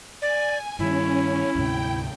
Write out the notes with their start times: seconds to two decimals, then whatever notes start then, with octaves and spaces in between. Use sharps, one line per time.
0.22 D5 G#5
0.79 G2 D#3 G3 C#4 E4
1.55 D2 G#2 C3 G5